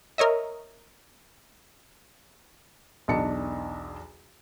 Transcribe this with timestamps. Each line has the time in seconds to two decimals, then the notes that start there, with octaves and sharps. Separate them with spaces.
0.18 A#4 C#5 D#5 E5
3.08 B1 E2 D4 D#5 A5 C#7